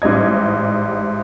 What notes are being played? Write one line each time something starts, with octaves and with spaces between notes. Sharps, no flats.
A1 G#2 G3 D#5 G#6